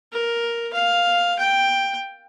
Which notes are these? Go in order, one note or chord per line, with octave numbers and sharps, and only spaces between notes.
A#4
F5
G5